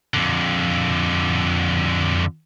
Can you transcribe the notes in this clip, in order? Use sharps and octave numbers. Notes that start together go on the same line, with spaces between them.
F2 D3